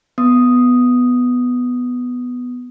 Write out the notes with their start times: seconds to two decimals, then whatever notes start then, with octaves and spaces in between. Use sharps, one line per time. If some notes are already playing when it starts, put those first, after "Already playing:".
0.18 B3 D#6